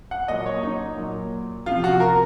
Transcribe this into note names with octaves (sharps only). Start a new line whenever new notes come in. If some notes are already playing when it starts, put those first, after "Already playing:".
F#5
A#2 F#3 D#5
C#5
D#4
A#2 F#3
C3 F3 F4
F#4
A#4